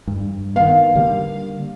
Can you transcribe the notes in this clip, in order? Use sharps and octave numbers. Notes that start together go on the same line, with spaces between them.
G2
D#3 B3 F5
D3 G3 A#3